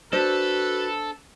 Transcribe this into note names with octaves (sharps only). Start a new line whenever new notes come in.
D4 F#4 A4 B4 C5